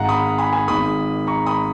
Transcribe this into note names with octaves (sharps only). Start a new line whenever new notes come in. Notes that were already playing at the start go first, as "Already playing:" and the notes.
Already playing: G#1 G#2 D#3 F5 F#5 A#5
B5 D#6
G#5 B5
G#5 B5
G#1 G#2 D#3 B5 D#6
A#5 C#6
B5 D#6